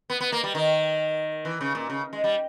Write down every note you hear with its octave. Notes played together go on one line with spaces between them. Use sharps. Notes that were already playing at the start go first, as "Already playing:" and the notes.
B3
B3
A#3
G3
D#3
E3
C#3
A#2
C#3
G#3
G3